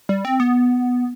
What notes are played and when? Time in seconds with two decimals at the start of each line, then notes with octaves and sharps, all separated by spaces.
0.09 G3
0.25 C4
0.40 B3